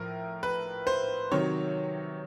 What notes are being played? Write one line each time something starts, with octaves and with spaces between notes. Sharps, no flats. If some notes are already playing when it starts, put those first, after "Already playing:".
Already playing: A2 F3 A#4
B4
C5
C3 D#3 F#3 C#5